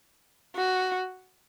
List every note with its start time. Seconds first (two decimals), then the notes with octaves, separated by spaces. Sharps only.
0.56 F#4